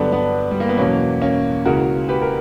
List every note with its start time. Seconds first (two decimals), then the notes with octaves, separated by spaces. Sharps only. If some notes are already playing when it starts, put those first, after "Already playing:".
Already playing: G2 D3 F#3 B3 D4
0.12 B3 D4
0.51 G3
0.60 A#3
0.69 B3
0.78 E2 B2 F#3 A#3 C#4
1.22 A#3 C#4
1.65 C#2 C#3 E3 F#4 A#4
2.09 G4 B4
2.22 A#4